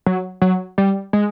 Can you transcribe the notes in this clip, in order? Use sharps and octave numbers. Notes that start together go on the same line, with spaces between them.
F#3
F#3
G3
G#3